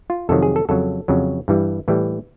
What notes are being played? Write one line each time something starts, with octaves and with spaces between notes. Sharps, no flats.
F4
F2 C3 D#3 F#3 A4
G#4
A4
F2 C#3 F#3 A4
F2 C#3 F#3
G2 E3 G3
A2 E3 G3